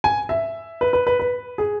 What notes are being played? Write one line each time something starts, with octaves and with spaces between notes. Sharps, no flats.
G#5
E5
B4
B4
B4
B4
G#4